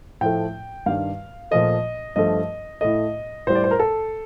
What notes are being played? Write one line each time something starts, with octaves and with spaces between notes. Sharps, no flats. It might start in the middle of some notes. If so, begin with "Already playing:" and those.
A2 F3 A3 G5
G2 D#3 G3 F5
A#2 F3 A3 D#5
G2 F3 A3 D#5
A2 A3 D#5
A2 G3 C5
D5
C5
A#4
A4